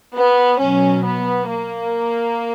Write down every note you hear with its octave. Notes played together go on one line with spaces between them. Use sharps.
B3
B2 F#3 C#4
B3
A#3